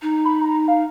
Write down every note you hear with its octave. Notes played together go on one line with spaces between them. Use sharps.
D#4
B5
A#5
F5